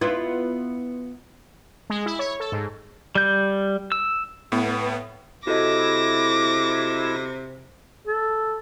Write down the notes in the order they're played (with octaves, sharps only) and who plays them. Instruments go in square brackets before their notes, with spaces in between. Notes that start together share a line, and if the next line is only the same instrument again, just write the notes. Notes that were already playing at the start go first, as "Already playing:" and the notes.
[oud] B3 E4 F4
[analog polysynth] G#3
E4
C#5
A4
G#2
[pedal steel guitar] G3 G6
E6
[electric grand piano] A2 [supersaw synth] B3
[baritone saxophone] C3 [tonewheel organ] E4 [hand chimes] F#4 A4 D#5 [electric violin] D6 A#6
[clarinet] A4